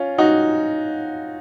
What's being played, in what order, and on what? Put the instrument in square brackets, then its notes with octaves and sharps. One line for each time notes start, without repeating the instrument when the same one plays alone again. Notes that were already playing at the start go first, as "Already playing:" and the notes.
Already playing: [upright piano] C#4 F4
D#4 F#4